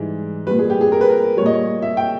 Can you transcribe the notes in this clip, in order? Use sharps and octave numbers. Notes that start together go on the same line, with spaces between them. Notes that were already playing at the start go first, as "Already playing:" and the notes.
Already playing: G#2 E3 G3
A#2 G3 B4
G#4
G4
G#4
A#4
B4
A#4
A#2 G3 C#5 D#5
C#5
E5
G5